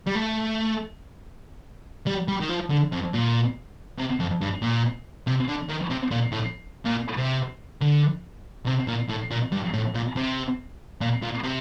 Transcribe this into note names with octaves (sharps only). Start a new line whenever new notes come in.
G3
A3
G3
G3
D#3
F3
D3
F2
A#2
C3
F2
G2
A#2
C3
D3
D#3
C3
A#2
A2
A#2
C3
D3
C3
A#2
A2
A#2
G2
A2
A#2
C3
A#2
A#2
C3